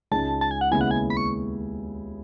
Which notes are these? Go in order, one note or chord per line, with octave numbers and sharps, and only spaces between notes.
C#2 C#3 G#3 D#4 A5
A5
G#5
F#5
D#2 C#3 G#3 B3 E4 G#5
F#5
G#5
B5
C#6